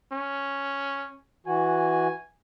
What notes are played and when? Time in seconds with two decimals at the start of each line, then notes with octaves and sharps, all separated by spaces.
0.12 C#4
1.47 E3 F#4 G#5